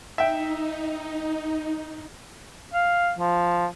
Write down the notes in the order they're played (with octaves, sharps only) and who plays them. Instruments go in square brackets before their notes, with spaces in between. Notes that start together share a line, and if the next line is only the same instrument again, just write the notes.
[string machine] D#4 [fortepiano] E5 G5
[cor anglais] F5
F3